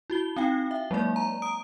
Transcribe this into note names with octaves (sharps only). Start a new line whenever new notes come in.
E4 F#4 G7
C4 D#4 F5 G5
E5
F#3 G#3 A#3 D5
A#5
D#6 D7